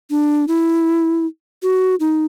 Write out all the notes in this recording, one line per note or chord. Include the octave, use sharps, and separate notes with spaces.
D4
E4
F#4
D#4